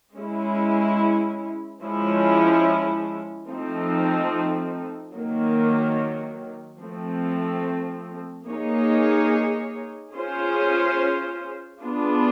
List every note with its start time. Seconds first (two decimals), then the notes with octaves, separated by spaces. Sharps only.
0.14 G#3 C#4 E4
1.81 F3 G#3 C#4 E4
3.48 F3 A3 C4 D#4
5.14 D#3 F#3 A#3
6.80 F3 A3 C4
8.47 A#3 D#4 G#4 C#5
10.13 C#4 F4 G#4 C5
11.80 B3 D4 F4 G#4